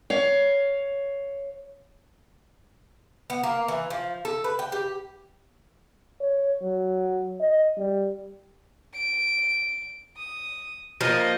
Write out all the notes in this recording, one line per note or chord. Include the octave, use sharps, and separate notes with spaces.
C#5 F5
B3
A#3
E3
F3
A4
B4
G5
G4
C#5
F#3
D#5
G3
D7
D#6
F3 A#3 D#5